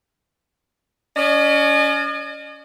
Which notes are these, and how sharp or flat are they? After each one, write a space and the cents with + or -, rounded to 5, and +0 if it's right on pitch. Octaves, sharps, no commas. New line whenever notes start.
C#4 +30 D#5 -40